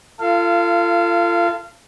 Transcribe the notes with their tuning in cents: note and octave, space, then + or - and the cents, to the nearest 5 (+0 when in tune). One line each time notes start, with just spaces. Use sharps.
F4 -30 A4 +30 F5 -20